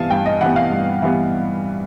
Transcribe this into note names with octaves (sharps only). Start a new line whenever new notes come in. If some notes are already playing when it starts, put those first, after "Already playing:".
Already playing: G2 E3 G3 B3 F5 G#5 A5
G2 G5
D#5
E3 G3 B3 F#5
F5
G2
E3 G3 B3